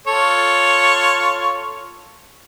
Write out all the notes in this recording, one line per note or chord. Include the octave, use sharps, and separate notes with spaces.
F4 A4 C#5